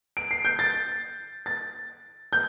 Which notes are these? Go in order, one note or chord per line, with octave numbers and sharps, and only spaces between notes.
D7
C7
G6
A6
A6
G6